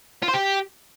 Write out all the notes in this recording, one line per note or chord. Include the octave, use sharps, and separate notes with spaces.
F4
C5
G4